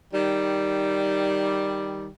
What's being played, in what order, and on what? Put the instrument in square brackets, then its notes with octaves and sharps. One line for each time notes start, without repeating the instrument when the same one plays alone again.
[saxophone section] D#3 G3